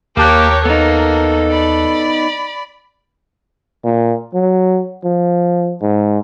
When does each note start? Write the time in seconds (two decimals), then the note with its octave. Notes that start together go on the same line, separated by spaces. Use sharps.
0.17 D#2 A#3 G4 A#4 C#5 A5 F#6
0.65 A#3 B3 D#4 A4
1.50 D5 B5
3.84 A#2
4.34 F#3
5.04 F3
5.81 G#2